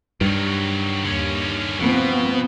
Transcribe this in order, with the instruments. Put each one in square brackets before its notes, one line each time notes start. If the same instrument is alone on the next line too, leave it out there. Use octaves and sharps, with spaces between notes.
[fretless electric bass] G2 [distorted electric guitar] D#3 F#3
[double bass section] D#2 [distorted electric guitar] D3 C#4
[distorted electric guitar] B2 [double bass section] F3 B3 C4